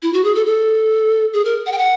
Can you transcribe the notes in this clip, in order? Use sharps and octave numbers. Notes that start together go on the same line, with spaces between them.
E4
F#4
G#4
A4
A4
G#4
A#4
F#5
G5
F#5